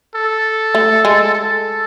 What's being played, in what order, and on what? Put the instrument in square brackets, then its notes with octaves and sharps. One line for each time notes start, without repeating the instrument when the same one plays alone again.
[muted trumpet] A4
[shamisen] A3
G#3
[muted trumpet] A4